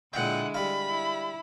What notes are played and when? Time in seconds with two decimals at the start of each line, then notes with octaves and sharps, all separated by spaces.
0.14 A#2 D3 G#3 E4 F#5 G5
0.54 G3 F5 B5
0.89 E4